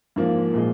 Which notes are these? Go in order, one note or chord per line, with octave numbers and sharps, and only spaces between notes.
G#2 F3 A#3
A#2 F3 G#3